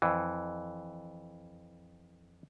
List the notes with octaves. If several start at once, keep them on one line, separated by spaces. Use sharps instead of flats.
F2 E3